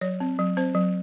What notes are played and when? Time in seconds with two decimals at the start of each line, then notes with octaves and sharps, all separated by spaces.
0.01 F#3 C#5
0.20 C4
0.39 F#3
0.57 C4 C5
0.75 F#3